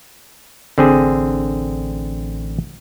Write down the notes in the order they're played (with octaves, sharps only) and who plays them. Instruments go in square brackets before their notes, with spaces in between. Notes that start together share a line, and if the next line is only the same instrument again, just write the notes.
[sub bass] A1 [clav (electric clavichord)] D3 C4 G#4